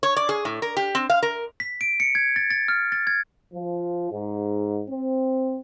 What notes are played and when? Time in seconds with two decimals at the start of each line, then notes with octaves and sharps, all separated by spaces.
0.03 C#5
0.17 D5
0.29 G#4
0.45 A2
0.62 A#4
0.77 G4
0.95 C4
1.10 F5
1.23 A#4
1.60 B6
1.81 D7
2.00 C#7
2.15 G#6
2.36 A6
2.51 A6
2.68 F6
2.92 A6
3.07 G#6
3.54 F3
4.12 G#2
4.89 C4